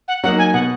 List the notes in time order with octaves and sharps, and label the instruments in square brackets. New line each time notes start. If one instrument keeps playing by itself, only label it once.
[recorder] F#5
[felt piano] F#3 A#3 D#4 [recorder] F#5
[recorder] G#5
[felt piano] B2 [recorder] F#5